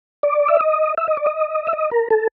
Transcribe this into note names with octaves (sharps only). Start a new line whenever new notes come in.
D5
E5
D#5
E5
D#5
D5
D#5
E5
D#5
A#4
A4